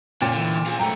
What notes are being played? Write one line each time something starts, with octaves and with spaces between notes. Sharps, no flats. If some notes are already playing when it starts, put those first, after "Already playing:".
A#2 C#3 C#4 G5
D3 E3
F4 G#4
F#2 A3 G5 A#5